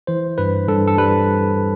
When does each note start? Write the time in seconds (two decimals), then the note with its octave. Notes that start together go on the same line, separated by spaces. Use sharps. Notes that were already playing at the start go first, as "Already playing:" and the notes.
0.07 E3 C5
0.38 G2 B4
0.68 G2 A4
0.88 A4
0.98 G3 B4